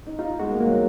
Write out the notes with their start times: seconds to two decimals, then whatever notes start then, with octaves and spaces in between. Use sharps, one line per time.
0.06 D#4
0.19 D#4 F4
0.39 G#3 F#4
0.50 A#3
0.60 A#3
0.66 F#3